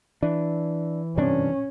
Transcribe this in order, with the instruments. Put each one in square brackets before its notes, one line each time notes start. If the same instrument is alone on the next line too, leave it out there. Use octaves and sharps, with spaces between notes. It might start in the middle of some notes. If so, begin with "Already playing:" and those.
[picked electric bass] E3 [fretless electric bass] D4
[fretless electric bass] G2 C3 D4 [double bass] C#4